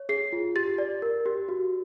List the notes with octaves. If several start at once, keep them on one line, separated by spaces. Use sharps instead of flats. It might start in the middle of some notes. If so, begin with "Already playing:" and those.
Already playing: C#5
G#4 C7
F4
G4 A6
D5
A#4
G4
F#4